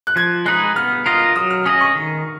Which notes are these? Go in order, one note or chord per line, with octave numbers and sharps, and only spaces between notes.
F#6
F3 G#6
G#3 D#4 G#4 B4 F#6
B3 F6
F4 A#4 D#5 F6
F#3 D#6
F6
C#4 G#4 D#5 D#6
C#6
D#3